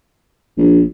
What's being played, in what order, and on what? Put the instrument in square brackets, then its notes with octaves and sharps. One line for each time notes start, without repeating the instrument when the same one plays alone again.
[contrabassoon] A#1